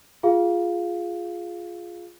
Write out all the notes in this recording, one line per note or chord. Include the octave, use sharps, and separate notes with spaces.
F4 G#4 F5